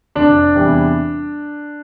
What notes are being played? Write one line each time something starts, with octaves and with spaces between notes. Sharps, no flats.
F1 D4 D5
E2 C3 E3 G3